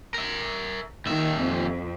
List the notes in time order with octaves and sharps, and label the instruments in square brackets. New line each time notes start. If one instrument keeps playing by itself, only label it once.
[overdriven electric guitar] A#4 E5
[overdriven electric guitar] D#2 E5 [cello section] D#3
[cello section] F2